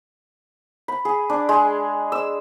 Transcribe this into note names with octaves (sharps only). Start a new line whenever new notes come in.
B5
G#4
D4
G#3
E6